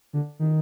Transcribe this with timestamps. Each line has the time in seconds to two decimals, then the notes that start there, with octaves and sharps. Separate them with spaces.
0.13 D3
0.39 D#3